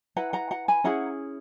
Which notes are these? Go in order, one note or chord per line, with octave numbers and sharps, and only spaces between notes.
E4 B4 F#5 A#5
F#5 A#5
F#5 A#5
G#5 B5
C#4 E4 G#4 F#5 A#5